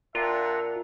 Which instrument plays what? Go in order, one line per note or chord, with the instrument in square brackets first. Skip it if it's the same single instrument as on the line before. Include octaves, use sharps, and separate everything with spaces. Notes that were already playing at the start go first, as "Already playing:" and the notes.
[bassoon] A#2 [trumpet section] D4 E5 G5 [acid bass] F4 [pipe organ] F#5 A#5